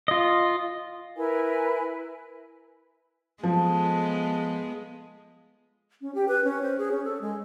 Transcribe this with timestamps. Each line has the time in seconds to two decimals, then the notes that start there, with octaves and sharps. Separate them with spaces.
0.08 F4 D#5
1.16 E4 A#4 B4 G#5
3.43 F3 G#3 B3 A4
6.01 C#4
6.15 G4
6.28 B4
6.44 C#4
6.63 C5
6.78 G#4
6.92 C#4
7.05 A4
7.21 G#3